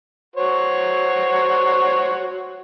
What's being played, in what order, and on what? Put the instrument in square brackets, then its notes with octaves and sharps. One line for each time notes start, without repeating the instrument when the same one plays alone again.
[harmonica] F#4 C5 C#5